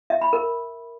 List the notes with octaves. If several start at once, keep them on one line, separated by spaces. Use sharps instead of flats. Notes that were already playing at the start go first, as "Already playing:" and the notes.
E5
B5
A#4